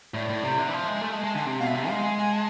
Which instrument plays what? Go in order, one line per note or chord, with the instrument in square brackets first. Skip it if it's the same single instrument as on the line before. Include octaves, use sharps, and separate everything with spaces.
[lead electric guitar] A2 [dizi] D5
[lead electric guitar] A2
C3
[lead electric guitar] D3 [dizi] E5
[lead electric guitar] E3
F3
G#3
[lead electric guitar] A3 [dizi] G#5
[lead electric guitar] G#3 [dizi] A5
[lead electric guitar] G#3 [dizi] A5
[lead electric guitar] D3 [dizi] G#5
[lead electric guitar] C3
[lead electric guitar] B2 [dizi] F5
[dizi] E5
[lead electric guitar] C3
[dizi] G#5
[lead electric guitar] G#3 [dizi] F5
[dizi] G#5
G#5
A5